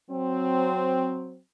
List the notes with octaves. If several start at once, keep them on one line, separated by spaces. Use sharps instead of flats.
F#3 C4